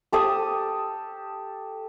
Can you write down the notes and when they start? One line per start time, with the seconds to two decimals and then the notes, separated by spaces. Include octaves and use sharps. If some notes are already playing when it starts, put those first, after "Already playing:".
0.13 G4 A4 A5 D#6